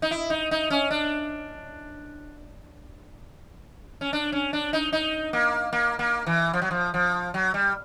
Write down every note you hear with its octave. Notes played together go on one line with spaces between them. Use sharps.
D#4
E4
D#4
D#4
C#4
D4
C#4
D4
C#4
D4
D#4
D#4
A#3
A#3
A#3
E3
F3
F#3
F3
F3
F#3
G3